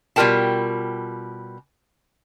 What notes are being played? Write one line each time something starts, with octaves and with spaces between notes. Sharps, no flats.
B2 G3 F4 A#4 G5 A5